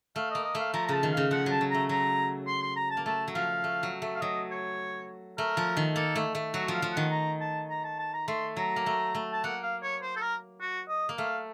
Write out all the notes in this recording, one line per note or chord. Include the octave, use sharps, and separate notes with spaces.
A3 F5
A#3 D#5
D#5
A3 F5
F3 A#5
A#5
C#3 A5
D#3
C#3 F5
F3 F#5
F#3 A5
F#3
A3 A#5
F#3 A#5
C6
C6
A#5
A5
A#3
A3 A5
F#3
F3 F5
A3
F#3
A3
F5
F#3 D#5
C#5
A3 A#4
F3
D#3
A#3 A4
A3
A3
F#3 F#4
F3
F5
F3
D#3 F#5
A#5
A5
A#5
A5
A5
A#5
A3 C6
F#3 A#5
A#3
A3
A3
A5
A#3 F#5
F5
C#5
C5
A4
A#4
F#4
D#5
A#3
A3 F5